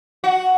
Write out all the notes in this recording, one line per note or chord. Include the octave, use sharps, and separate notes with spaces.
F#4